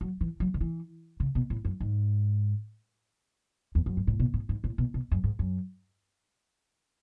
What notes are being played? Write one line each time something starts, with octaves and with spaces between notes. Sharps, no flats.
F#3
E3
F#3
D3
E3
C#3
B2
A2
F#2
G#2
E2
F#2
G#2
A2
B2
A2
G#2
A2
B2
B2
F#2
G#2
F#2